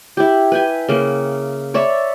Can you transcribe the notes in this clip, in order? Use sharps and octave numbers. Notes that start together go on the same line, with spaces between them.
E4 G4
B4 G5 G#5
C#3 A#3
C#5 D5 E5 B5